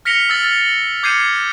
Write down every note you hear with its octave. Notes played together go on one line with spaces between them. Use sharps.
F6 A#6 B6 C#7 F7 G7
E6 F6 A6
A6
D6 G6 G#6 C7 C#7 D#7